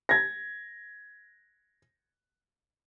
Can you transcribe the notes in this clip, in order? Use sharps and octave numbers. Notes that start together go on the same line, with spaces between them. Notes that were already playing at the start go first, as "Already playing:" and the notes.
G#6 A#6